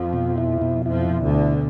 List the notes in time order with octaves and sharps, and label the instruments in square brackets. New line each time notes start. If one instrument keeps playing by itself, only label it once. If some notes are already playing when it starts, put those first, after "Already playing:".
Already playing: [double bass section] F2 F3 [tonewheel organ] F4
[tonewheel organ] B2
E4
B2
[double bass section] F2 F3 [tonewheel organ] E4
[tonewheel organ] B2
[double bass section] D2 D3
[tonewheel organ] E4